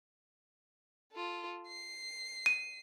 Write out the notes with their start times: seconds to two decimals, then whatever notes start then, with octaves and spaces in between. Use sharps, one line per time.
1.12 F4 A4
1.68 C7
2.46 D#7